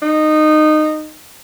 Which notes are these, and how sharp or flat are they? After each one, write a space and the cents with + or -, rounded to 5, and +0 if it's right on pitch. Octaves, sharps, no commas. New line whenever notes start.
D#4 -15